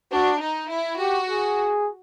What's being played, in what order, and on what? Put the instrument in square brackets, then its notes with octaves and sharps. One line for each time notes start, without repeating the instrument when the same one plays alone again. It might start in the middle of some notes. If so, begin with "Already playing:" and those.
[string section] D4 [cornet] F#4
[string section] D#4
E4
[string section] F#4 [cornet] G4
[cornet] G#4